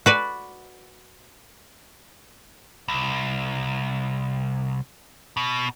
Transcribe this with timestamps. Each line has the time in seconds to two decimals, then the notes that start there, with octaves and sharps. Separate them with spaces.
0.06 F#4 B4 D5
2.88 C2
5.37 B2